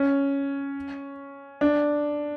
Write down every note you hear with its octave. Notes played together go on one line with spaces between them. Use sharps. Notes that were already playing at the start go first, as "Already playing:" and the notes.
Already playing: C#4
D4